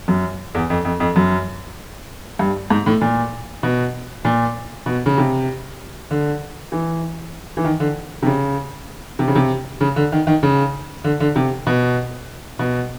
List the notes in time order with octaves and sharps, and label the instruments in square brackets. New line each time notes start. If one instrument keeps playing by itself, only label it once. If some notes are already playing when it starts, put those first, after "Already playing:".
[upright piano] F#2
E2
F2
F2
F2
F#2
G2
G#2
A2
A#2
B2
A#2
B2
C#3
C3
D3
E3
E3
D#3
D3
C3
C#3
C3
C#3
C3
C#3
D3
D#3
D#3
C#3
D3
D3
C3
B2
B2